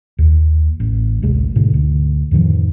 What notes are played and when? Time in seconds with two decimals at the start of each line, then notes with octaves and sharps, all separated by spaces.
0.19 D#2
0.80 A1
1.22 A1 D2 C3 G#3
1.56 G#2 B2 D3
1.74 D2
2.31 F2 A2 D#3 F3